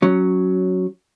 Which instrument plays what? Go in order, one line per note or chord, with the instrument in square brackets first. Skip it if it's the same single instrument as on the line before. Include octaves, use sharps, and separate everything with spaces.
[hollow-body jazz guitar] F#3 C#4